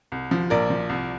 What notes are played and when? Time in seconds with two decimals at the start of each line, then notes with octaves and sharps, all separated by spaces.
0.12 C2
0.31 F3
0.50 A#1 A#4 D5
0.70 F3
0.89 C2